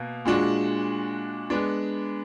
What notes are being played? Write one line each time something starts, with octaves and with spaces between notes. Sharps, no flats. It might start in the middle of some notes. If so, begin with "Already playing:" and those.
Already playing: B2 A#3
A#2 G#3 D4 F#4
G#3 B3 D4